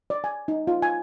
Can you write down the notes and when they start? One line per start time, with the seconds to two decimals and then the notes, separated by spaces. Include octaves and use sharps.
0.10 D5
0.24 G#5
0.48 D#4
0.67 F4
0.82 G#5